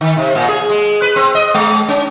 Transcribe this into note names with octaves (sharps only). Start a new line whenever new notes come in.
D#3
C3
A#2
G#4
G#3
B4
C4
D#5
G#3
C#4